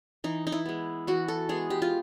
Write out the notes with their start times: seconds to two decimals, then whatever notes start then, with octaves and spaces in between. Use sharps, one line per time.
0.24 E3 D#4
0.47 D#4
0.52 E4
0.66 G#3 B3
1.07 E3 F#4
1.28 A4
1.49 G#3 B3 G#4
1.70 G4
1.82 F4